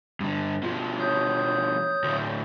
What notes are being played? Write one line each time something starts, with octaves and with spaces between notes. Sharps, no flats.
G2 D3
B2 F3
C#5 D#6 G6
D2 A2